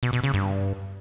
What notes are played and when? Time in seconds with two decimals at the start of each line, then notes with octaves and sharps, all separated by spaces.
0.03 B2
0.13 B2
0.23 C#3
0.34 G2